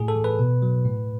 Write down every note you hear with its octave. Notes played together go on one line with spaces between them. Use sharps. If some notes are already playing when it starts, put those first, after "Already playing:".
Already playing: A2 G#4
A4
E3
B4
B2
F#3
A2